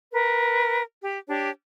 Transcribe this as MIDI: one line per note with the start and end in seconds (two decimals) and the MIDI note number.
0.12 0.82 70
0.12 0.82 71
1.02 1.18 67
1.28 1.50 62
1.28 1.50 67
1.28 1.50 73